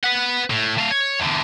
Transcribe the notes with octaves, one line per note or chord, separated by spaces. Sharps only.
B4 F#5
A2
A3 F5
C#5
E2 D3